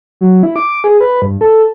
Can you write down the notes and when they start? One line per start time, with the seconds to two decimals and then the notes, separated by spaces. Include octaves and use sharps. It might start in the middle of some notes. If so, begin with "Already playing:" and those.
0.21 F#3
0.43 E4
0.56 D6
0.84 G#4
1.01 B4
1.22 G2
1.41 A4